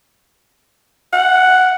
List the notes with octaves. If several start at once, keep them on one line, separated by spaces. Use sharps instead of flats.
F#5